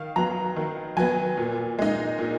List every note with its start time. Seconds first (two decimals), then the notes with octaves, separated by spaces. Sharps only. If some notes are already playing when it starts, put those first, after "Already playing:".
Already playing: D#3 F5
0.16 F#3 B3 A#5
0.56 D#3
0.97 F#3 B3 G#5
1.37 A#2
1.79 G#3 D#4
2.19 A#2